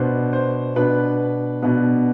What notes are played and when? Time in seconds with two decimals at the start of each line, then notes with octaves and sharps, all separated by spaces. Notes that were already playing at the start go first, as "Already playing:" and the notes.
Already playing: B2 B3 D4 C5
0.33 C5
0.76 B2 B3 D4 B4
1.62 B2 B3 D4